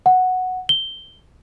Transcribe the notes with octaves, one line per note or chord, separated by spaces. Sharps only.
F#5
G7